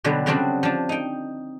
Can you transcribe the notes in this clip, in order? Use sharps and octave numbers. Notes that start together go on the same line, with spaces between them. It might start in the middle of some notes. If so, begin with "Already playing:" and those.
B2 D3 F#3 G3
C#3 F#3 G3 C4 D4 F#4
F3 D4
D#4 G5